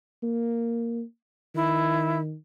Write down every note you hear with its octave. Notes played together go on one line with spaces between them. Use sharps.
A#3
D#3 E4